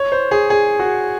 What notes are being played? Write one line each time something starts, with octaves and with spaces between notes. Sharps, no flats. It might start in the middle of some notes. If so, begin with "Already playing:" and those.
Already playing: C#5
C5
G#4
G#4
F#4